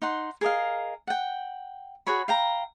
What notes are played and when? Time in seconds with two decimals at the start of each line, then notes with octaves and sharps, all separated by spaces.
0.02 D#4 F#5 C6
0.41 G#4 A#4 D#5 F5
1.07 F#5 G5
2.07 F#4 G#4 C#5 B5
2.28 F5 G5 A#5